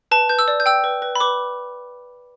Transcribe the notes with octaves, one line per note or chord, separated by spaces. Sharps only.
B4 A5
B4 G6
E6
D5
G6
G5 E6
B4
B4
B5
B4 D6